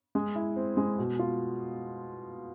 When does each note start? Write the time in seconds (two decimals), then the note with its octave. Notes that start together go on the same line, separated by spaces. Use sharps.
0.15 G#3
0.36 E4
0.56 C4
0.77 G#3
0.99 B2
1.19 F4